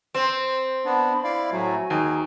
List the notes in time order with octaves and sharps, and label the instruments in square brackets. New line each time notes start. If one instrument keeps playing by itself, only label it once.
[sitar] C4
[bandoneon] B3 D4 [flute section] B5
[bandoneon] E4 D5 F5
[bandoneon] A2 F#3 A3 [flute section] F#4 G#5 A#5
[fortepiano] D#2 [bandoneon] G#4